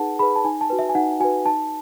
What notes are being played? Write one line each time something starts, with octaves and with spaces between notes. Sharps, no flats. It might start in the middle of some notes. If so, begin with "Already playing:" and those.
Already playing: D#4 G#4 B4 F#5 A5
G#4 B4 B5
A5
D#4 G#5
A5
F#4 B4
E5
G#5
D#4 F#5
F#4 B4 G#5
D#4 A5